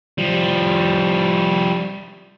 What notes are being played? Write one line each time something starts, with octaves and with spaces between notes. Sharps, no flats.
F3 G3